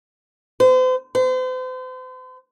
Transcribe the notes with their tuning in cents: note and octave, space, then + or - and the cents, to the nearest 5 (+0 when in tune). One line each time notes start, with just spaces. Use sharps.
C5 -40
C5 -40